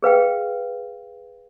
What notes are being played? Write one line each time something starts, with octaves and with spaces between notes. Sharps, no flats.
G#4 B4 F5 G5